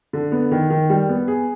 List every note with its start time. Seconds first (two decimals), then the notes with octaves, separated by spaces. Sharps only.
0.13 D3
0.32 B3
0.51 D#3
0.70 D#3
0.90 G3
1.09 B3
1.28 G#4